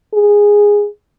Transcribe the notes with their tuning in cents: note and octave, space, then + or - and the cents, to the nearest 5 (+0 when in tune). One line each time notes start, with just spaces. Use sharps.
G#4 -10